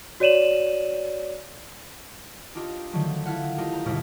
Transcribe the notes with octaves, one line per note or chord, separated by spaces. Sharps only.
F#4 C#5 D5 D#7 E7 F#7
D4 D#4 F4 G4
D3 D#3 F3 F#3 A3
E4 A4 F5 F#5
A3 D#4 F4 G4 A#4
C5 A#5
G1 D#2 B2 E4 F6